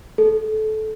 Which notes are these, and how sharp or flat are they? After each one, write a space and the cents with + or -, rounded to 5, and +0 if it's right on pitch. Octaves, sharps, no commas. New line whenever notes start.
A4 -20